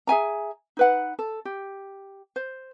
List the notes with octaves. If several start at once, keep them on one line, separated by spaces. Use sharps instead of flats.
G#4 E5 G#5 A#5
D#4 B4 F#5
A4
G4
C5